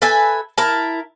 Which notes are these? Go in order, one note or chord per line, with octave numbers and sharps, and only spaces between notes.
A4 B4 E5 G#5
E4 A#4 A5